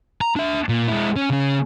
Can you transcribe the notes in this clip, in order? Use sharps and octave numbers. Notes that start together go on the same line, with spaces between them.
A#5
D4 E5
A#2
G#3 E4
C#4
C#3 C#4